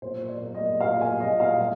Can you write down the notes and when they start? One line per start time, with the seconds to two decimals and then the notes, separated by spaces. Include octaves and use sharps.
0.02 A#2 C5
0.29 D5
0.42 A#3
0.55 D#5
0.81 A#2 F5
1.01 G#5
1.20 A#2 D#5
1.40 F5
1.60 G3